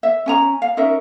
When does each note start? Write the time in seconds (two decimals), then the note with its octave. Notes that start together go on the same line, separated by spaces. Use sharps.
0.03 E5
0.26 C#4 G#5 A#5
0.62 F5
0.77 C#4 D#4 A#4 E5